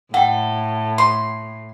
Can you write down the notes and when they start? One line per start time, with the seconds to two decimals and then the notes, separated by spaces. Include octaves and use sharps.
0.14 A2 A4 F#5 G5
0.98 C6